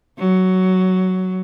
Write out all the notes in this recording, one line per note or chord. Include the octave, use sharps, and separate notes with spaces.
F#3